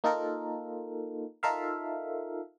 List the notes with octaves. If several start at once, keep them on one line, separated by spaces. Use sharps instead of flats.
A#3 D#4 F4 A4 A#4
D#4 F4 A4 A#4 E5 F5